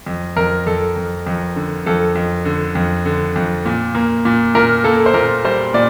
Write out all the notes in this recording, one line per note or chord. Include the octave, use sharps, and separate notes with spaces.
F2
F2 A#4
F2 A4
F2
F2
D3
F2 A4
F2
D3
F2
D3
F2
A#2
A#3
A#2
A#2 A#4
A#3 A4
C5
A#2 A#4
G3 C5
A#2 D5